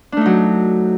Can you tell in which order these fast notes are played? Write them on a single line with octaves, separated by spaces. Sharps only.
D4 A3 D#4 F#3